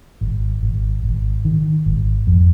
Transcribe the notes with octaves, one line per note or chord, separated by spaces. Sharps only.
G#1
G#1
G#1
D#3
G#1
F2